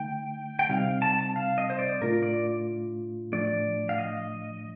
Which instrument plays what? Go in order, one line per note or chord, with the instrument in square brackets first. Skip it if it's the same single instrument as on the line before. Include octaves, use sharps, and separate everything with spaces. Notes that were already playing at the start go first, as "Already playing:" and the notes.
Already playing: [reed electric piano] D3 A3 D#4 [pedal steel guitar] G5
[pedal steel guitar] G5
[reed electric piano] C3 G3 C4 D#4 [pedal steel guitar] F5
[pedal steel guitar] A5
A5
F5
D#5
C5
D5
[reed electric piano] A2 A3 D4 F4 [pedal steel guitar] A#4
[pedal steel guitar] D5
[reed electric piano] A2 F3 A3 D4 [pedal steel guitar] D5
[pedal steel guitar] F5
D#5